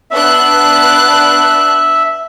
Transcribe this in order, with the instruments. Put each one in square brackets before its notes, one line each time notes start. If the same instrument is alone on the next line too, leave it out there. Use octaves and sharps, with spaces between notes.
[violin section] B3 D4 F#6 [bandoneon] E5